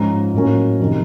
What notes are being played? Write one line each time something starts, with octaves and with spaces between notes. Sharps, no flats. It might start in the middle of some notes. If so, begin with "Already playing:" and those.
Already playing: G#2 F3 G#3 C#4 A#5
A2 F#3 A#3 C#4
F2 C3 D#3